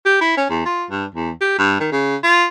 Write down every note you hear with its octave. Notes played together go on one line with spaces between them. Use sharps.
G4
E4
C#4
E2
F4
G2
E2
G4
G2
D#3
C#3
F4